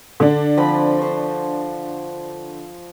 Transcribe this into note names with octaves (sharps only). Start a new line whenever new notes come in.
D3 D4
F3 C4 B5
C5 C#6